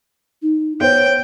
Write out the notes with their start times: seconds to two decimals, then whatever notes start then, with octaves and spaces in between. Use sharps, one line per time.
0.42 D#4
0.81 B3 C5 C#5 G5